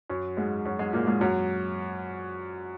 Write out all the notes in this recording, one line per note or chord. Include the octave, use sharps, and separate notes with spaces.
F#2 F#3
G#2 G#3
F#2 F#3
G#2 G#3
A#2 A#3
G#2 G#3
F#2 F#3